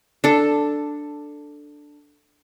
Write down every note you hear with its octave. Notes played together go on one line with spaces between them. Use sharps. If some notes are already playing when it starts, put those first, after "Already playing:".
D4 A4